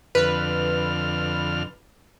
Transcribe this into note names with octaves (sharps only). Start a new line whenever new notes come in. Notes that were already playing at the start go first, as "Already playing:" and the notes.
F2 D3 B4 F6